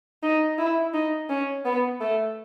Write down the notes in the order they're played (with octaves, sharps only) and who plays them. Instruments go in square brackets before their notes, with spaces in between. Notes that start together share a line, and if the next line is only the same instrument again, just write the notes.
[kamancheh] D#4
E4
D#4
C#4
B3
A3